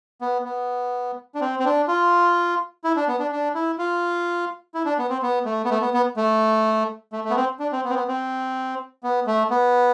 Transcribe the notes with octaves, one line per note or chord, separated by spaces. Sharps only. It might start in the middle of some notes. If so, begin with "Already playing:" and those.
B3
B3
D4
C4
C4
D4
F4
E4
D4
B3
D4
D4
E4
F4
E4
D4
B3
C4
B3
A3
B3
A3
B3
B3
A3
A3
A3
B3
C4
D4
C4
B3
C4
B3
C4
B3
A3
B3